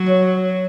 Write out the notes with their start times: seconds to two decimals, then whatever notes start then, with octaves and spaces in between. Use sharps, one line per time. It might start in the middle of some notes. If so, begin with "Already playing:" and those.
Already playing: F#3
0.09 C#5